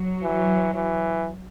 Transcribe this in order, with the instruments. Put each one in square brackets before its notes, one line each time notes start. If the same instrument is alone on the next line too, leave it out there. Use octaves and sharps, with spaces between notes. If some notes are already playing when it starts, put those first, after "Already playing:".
Already playing: [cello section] F#3
[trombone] E3
E3